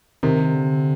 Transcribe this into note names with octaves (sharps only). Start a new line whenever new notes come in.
C3 D#3
D3